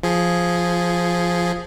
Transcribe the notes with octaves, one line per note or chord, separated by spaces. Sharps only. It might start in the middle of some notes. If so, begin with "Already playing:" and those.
F3 G#4